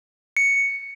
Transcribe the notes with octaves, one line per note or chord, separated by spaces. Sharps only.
C#7